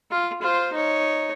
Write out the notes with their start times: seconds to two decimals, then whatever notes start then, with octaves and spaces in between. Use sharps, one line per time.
0.11 F4
0.41 F4 C5
0.72 D#4 C#5